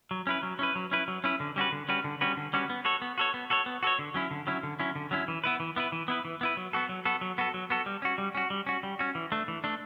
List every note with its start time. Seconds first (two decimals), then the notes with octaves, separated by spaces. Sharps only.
0.11 F#3
0.27 C#4 E4 B4
0.43 F#3
0.59 C#4 E4 B4
0.75 F#3
0.91 C#4 E4 B4
1.08 F#3
1.24 C#4 E4 B4
1.40 D3
1.56 G3 C#4 F#4 B4
1.72 D3
1.89 G3 C#4 F#4 B4
2.04 D3
2.21 G3 C#4 F#4 B4
2.37 D3
2.53 G3 C#4 F#4 B4
2.70 B3
2.85 F#4 A4 C#5
3.02 B3
3.18 F#4 A4 C#5
3.34 B3
3.50 F#4 A4 C#5
3.66 B3
3.83 F#4 A4 C#5
3.99 D3
4.14 F#3 C#4 E4
4.31 D3
4.47 F#3 C#4 E4
4.63 D3
4.79 F#3 C#4 E4
4.96 D3
5.11 F#3 C#4 E4
5.28 E3
5.44 B3 E4 B4
5.60 E3
5.76 B3 E4 B4
5.92 E3
6.08 B3 E4 B4
6.25 E3
6.41 B3 E4 B4
6.57 F#3
6.73 B3 F#4 A4
6.89 F#3
7.05 B3 F#4 A4
7.21 F#3
7.38 B3 F#4 A4
7.54 F#3
7.70 B3 F#4 A4
7.86 G3
8.02 C#4 F#4
8.18 G3
8.35 C#4 F#4
8.50 G3
8.67 C#4 F#4
8.83 G3
8.99 C#4 F#4
9.15 E3
9.32 A3 D4
9.48 E3
9.64 A3 D4